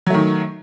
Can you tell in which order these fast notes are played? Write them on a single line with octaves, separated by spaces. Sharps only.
F#3 A3 D#3